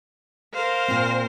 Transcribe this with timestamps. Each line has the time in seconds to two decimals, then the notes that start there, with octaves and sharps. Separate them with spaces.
0.54 A#4 C5 F5
0.88 A#2 C4